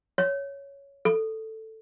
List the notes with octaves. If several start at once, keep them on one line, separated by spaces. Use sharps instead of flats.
C#5
A4